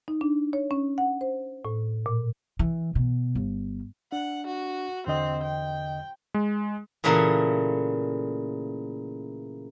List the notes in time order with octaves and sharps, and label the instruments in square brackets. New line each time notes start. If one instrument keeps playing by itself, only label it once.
[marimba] D#4
D4
C#5
C#4
F#5
C5
A2
A#2
[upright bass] E3
B2
G1
[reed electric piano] D4 [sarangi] F#5
[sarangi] F#4
[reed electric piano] E2 D3 D#5 [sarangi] C4
[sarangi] G5
[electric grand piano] G#3
[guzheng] A#2 C#3 E3 A3 A#3